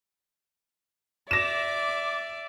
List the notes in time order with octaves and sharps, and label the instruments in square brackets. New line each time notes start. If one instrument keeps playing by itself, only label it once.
[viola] D5 E5 [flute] D6 [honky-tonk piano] A#6 E7